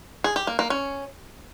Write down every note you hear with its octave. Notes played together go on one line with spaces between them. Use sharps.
G#4
G4
A#3
A#3
C#4